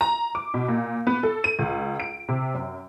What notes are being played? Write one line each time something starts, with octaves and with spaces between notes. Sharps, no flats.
A#5
D6
B2
A#2
B3
A4
D#7
C#2
D7
C3
F#2